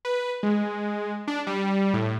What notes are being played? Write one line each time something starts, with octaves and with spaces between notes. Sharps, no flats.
B4
G#3
D4
G3
A2